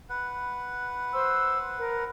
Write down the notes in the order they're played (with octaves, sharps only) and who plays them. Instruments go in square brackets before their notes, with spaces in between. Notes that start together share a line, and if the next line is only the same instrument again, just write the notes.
[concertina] B4 F#5
[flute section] C5 C6 E6
A#4